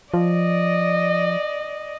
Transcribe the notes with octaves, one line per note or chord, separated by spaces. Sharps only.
F3 D5 D#5